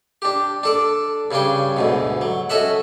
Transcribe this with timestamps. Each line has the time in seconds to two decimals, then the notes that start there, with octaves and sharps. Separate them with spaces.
0.22 D4 G4
0.63 D4 A4 D5
1.31 G2 C#3 C#4 D4 G5
1.77 D2 G#2 B2
2.21 F#3
2.50 C#4 F#4 A4 D#5 E5 F#5